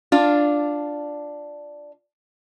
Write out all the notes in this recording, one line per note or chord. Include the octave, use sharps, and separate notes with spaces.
D4 F4